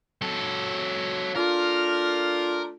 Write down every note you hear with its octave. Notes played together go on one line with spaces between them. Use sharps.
F#3 A4
A3 D4 F4 A#4